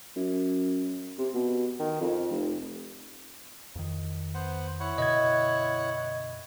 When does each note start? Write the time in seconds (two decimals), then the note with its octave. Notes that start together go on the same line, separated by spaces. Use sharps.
0.16 F#2
1.18 C3
1.34 B2
1.80 D#3
2.01 F2
2.31 F1
3.76 F2 D#3
4.34 B3 C5 F#5
4.80 E4 C#5 F#5
4.98 F#2 B2 D3 D#5 G#6